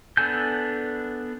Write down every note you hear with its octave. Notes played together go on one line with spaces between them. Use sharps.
B3 D4 A4 G#5 G6